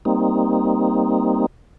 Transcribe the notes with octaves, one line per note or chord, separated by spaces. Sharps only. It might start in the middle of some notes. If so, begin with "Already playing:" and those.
G3 A#3 C4 D#4